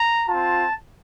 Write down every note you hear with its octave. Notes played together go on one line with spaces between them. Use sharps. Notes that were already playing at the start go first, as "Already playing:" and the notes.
Already playing: A#5
C4 F4 A5